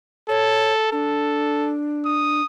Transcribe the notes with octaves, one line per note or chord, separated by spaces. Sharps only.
A4 C#5
D4 A4
D#6